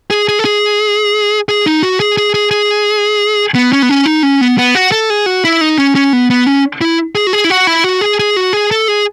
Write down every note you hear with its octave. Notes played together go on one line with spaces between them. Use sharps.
G#4
G#4
A4
G#4
G#4
D#4
F#4
G#4
G#4
G#4
G#4
B3
C#4
B3
C#4
D#4
C#4
B3
B3
F#4
A4
G#4
F#4
E4
D#4
C#4
C#4
B3
B3
C#4
E4
G#4
F#4
G#4
E4
F#4
E4
F#4
G#4
G#4
F#4
G#4
A4
G#4